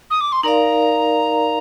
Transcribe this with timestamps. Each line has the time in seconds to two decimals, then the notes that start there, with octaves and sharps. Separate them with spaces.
0.10 D#6
0.21 D6
0.32 C6
0.43 D#4 A#4 D5 F5 A#5